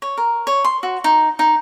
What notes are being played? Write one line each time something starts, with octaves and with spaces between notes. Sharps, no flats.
C#5
A#4
C#5
C6
F#4
D#4
D#4